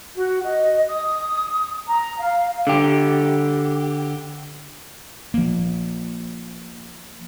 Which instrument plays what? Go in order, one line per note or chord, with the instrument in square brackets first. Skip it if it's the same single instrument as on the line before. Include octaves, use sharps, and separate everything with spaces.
[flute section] F#4
D#5
D#6
A#5
F5
[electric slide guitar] D3 G4
[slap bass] F3 A#3